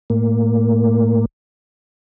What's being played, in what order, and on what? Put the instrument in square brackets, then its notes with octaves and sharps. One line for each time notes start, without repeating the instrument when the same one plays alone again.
[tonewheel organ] A2 A#3